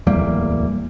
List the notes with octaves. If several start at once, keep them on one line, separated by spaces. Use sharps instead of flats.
D1 E2 G3 A#3